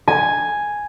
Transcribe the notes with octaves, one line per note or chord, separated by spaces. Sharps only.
G#5